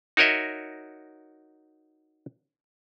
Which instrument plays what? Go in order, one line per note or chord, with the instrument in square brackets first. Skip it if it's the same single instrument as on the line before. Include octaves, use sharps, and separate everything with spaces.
[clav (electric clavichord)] D#4 F#4 A#4 C#5 D#5 E5